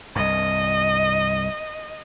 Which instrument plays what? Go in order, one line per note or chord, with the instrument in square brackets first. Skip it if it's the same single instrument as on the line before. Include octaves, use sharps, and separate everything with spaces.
[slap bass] C2 G2 [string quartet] D#5